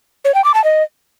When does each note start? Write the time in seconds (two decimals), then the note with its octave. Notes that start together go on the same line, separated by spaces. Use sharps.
0.25 C#5
0.35 G5
0.44 D6
0.54 A5
0.64 D#5